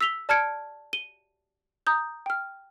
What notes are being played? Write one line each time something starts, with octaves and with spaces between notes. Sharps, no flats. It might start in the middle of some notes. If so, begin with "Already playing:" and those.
E6 B6 F7 G7
D5 A5 F6 G#6 C#7 D7
D#7 G7
A#5 D#6 G6
G5 F6